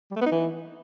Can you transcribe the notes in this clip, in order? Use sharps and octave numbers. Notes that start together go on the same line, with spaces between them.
G3
A3
B3
D#4
E3